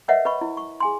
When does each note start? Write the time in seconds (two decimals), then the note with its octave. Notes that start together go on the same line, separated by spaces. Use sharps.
0.08 A#4 B4 C#5 D#5 E5 F#5
0.25 B4 D#5 B5 C#6
0.41 E4
0.57 C#6
0.80 G#4 G#5 C6